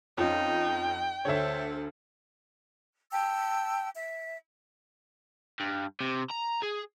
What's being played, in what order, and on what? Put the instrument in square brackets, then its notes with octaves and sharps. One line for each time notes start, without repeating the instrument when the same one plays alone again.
[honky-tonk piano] F2 [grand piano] C#4 F4 [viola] D#4 [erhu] G5
[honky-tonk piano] D2 D3 [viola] A4 C5 [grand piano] C#5 E5
[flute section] G5 A5 E6
E5
[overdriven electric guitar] G2
C3
A#5
G#4